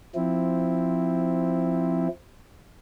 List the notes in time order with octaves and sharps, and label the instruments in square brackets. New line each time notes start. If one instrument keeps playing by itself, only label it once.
[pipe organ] F3 C4 E4